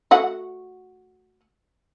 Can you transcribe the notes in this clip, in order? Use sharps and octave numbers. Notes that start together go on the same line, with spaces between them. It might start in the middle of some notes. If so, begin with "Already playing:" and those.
A3 F#4 F#5